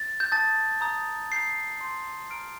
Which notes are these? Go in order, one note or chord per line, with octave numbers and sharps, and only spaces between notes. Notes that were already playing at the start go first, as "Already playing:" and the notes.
Already playing: A6
G6
A5 D#6 G6 A6
A#5 D#6 G6
A#5 D#6 G6 C7
C6 G6
A#5 F6 D7